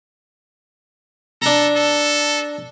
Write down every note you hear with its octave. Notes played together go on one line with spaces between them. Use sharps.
D4 A4 A#5
A4